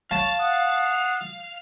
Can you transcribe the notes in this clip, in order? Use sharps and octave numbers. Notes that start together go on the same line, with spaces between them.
C#5 F5 A5
F#5 D#6